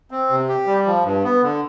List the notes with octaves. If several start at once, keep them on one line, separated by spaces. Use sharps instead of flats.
C4
C3
G4
G3
F3
G2
B3
D3